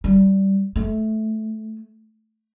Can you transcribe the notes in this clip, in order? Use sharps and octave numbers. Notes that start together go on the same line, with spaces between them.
G3
A3